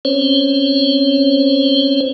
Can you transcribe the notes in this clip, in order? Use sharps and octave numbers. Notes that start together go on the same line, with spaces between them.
C4 C#4 C5 C#5